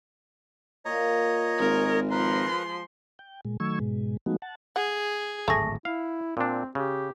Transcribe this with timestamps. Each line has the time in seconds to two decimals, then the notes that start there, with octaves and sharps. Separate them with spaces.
0.85 A#2 C#5 D#5 A#5
1.59 G#1 G#3 A#4
2.11 F3 A#4 B4 A#5 C6
3.19 G5
3.45 A#2 G#3
3.60 D#3 F#3 A3 C#6 E6 G#6
3.80 G#2 B2 G#3
4.26 F3 G#3 A3 B3 D#4 F#4
4.42 F#5 A5
4.76 G#4 F#5
5.48 D1 G#1 A3 G#4 A5 C#6 A#6
5.85 E4 F5
6.37 A#2 C4 D4
6.75 C#3 G4